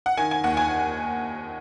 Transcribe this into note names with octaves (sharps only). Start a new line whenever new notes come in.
F#5
D#3 G#5
G#5
D#2 F#5
G#5